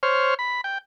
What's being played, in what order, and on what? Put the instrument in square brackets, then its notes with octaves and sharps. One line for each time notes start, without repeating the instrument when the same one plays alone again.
[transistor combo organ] C5 C#5 F6
B5
G5